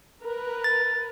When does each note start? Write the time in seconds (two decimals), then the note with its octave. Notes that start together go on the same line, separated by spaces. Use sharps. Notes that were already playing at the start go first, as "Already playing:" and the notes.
0.21 A#4 B4
0.64 A6